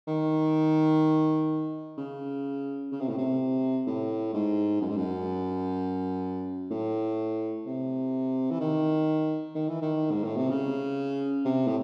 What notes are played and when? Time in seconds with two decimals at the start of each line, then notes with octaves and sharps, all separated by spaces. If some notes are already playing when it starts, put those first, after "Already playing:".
0.07 D#3
1.97 C#3
2.92 C#3
3.01 C3
3.09 A2
3.17 C3
3.87 A2
4.34 G#2
4.81 F#2
4.89 G#2
4.96 F#2
6.71 A2
7.66 C3
8.50 E3
8.60 D#3
9.55 D#3
9.68 E3
9.82 D#3
10.11 G#2
10.24 A2
10.36 C3
10.49 C#3
11.45 C3
11.67 A2